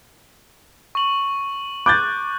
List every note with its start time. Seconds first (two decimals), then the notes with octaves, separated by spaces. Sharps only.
0.95 C#6 F#7
1.86 D6 F#6 G6 A6